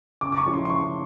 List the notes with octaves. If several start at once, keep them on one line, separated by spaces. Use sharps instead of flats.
C#3 D6
D6
C#6
F3 G#3 C#4 E4
C6
C6
C#3 C#6